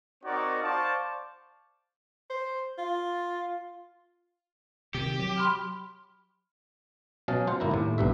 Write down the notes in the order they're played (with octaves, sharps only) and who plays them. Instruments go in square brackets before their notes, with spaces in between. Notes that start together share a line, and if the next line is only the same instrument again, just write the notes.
[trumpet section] C4 D#4 F#4 A#4 C#5 D5
C5 D5 F5 A5 C#6 D6
[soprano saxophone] C5
F4
[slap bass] C3 D#3 [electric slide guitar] G4
[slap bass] F#3
[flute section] B5 C6 F6
[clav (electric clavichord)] B2 F#3 C#4 D#5 F5 A5
F4 C5 F#5
G1 A#3 E4 A#5
D#2 A2
B1 G2 E5